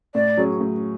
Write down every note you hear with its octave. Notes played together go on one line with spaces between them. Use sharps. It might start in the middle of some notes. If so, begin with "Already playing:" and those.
A2 D5
F#3 C#4 G#4
A2